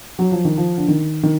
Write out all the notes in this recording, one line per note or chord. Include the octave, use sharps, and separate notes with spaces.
F#3
F3
D#3
F3
D3
D#3
D#3